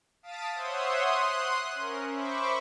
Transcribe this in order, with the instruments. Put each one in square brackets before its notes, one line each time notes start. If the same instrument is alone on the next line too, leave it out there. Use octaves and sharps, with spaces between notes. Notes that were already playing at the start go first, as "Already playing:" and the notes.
[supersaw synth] F5 A5 D#6 A6 B6 D7
C5 C#5 E5 F#5 C6 D#6
C6 D#6 F#6
C#4 A#4
C5 E5 B5 C#6 D6